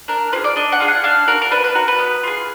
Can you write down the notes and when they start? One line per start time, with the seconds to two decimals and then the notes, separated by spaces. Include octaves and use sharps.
0.08 D4 A#4
0.32 F4 B4
0.36 G#4
0.44 D5
0.56 D4 D#5
0.72 F#5
0.80 F4 G#4
0.88 F#5
1.04 D4 F5
1.28 F#4 A#4
1.42 A#4
1.51 D4 B4
1.64 B4
1.75 F#4 A#4
1.88 B4
1.99 B3
2.23 F4 G#4